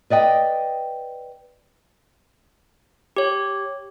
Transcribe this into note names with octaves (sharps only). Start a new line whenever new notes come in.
B4 D5 D#5 G5
G4 C#5